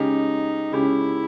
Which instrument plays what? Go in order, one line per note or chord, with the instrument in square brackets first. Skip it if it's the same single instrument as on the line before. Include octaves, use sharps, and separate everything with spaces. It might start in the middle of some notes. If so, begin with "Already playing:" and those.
Already playing: [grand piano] C#3 G#3 C#4 G4 [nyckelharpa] D#4
[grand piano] C#3 G#3 C#4 G4 [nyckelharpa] E4